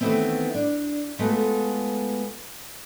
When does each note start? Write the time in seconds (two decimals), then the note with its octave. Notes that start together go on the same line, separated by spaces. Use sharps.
0.01 D#3 E3 A3 B3 C4
0.54 D4
1.19 G#3 A3 B3 F4 F#4 A4